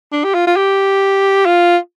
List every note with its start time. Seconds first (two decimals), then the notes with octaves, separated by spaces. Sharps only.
0.12 D4
0.24 G4
0.34 F4
0.47 F4
0.57 G4
1.46 F4